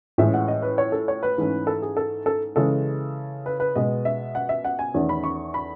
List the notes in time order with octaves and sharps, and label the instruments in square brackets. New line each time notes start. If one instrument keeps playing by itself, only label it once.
[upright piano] A2 E3 G#3 C#4 E5
F#5
D#5
B4
C#5
A4
C#5
B4
G#2 E3 A3 C#4
A4
G#4
A4
A4
C#3 E3 G#3 C#4 A4
B4
B4
B2 G#3 B3 D#5
E5
F#5
E5
F#5
G#5
E2 D#3 A3 C#4
B5
C#6
B5